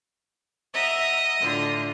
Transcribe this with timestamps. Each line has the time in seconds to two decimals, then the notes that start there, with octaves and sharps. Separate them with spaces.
0.74 D#5 E5 F#5 A#5
1.40 A2 D3 F4